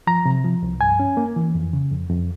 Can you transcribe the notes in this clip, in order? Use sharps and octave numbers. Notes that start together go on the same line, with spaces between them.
F3 A#5
C3
F3
C2
G2 G#5
C#4
A#3
E3
F2
C#3
F2
F2